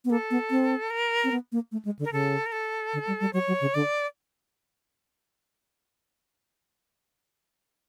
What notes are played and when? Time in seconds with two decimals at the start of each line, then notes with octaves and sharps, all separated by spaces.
0.05 B3
0.10 A#3 A4
0.31 B3
0.51 C4
0.90 A#4
1.24 C4
1.32 B3
1.52 A#3
1.72 A3
1.85 G#3
1.99 D3
2.05 A#4
2.12 C#3 A4
2.46 A#4
2.52 A4
2.93 D3
3.07 G3
3.20 G3
3.33 F#3 C#5
3.47 F#3
3.61 C#3
3.74 D3 D5